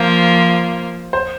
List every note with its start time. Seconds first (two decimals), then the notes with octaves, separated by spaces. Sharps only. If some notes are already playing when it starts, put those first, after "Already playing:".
Already playing: F3 A#3 F4 C5
1.13 C5